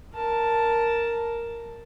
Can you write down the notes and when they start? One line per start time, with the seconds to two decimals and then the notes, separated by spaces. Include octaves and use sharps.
0.14 A#4 A5